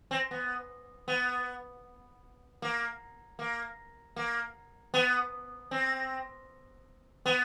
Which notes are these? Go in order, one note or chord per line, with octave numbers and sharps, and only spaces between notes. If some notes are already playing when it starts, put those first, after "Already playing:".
C4
B3
B3
A#3
A#3
A#3
B3
C4
B3